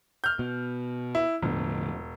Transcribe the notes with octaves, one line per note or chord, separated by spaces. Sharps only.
F6 G6
B2
E4
E1 A2 D3 F3